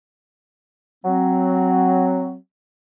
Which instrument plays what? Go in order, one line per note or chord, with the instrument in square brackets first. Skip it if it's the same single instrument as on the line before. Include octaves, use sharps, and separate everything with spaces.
[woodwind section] F#3 C4